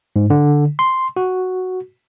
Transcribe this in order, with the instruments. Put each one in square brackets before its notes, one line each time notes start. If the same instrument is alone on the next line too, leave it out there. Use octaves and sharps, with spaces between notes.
[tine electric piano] G#2
D3
C6
F#4